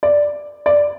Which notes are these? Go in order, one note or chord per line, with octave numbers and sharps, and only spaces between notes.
D5
D5